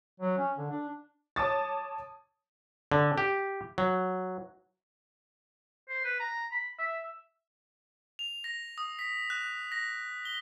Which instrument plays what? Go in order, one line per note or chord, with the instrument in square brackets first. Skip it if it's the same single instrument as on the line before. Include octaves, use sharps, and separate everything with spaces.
[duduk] F#3
C#4
D3
D4
[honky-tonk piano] C#5 A5 D6 D#6 A6
[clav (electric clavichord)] D3
G4
F#3
[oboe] C5
B4
A#5
B5
E5
[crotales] F7
A#6
D#6
B6
F#6
A#6
G7